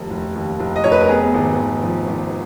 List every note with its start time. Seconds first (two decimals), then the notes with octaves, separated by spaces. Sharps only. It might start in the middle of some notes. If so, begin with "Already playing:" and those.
Already playing: F1 D#2
0.10 F1
0.35 D#2
0.60 F1
0.76 D#5
0.84 F1 C#5
0.92 B4
1.01 A#4
1.09 B3 G#4
1.34 G#1
1.58 G#1
1.83 F3
2.07 G#1